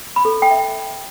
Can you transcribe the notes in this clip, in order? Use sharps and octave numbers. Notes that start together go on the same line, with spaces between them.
B5
A4
B5
G5
E5